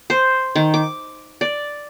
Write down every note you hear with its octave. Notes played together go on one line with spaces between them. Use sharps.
C5
D#3
D6
D5